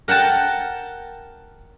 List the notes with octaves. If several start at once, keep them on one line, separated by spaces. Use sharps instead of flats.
A#4 F#5 G5 A5